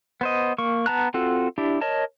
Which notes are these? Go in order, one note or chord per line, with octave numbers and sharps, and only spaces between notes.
B3 C5 D#5
A#3 C#6
B3 A5 A#5 F#6
C4 F4 F#4 A4
D4 E4 G4
A#4 C#5 D#5 A5